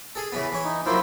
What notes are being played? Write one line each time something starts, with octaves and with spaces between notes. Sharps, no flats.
G#4 A4
C#3 E3 B3
E3 C#5
D#4
F#3 A#3 E4 F4 C5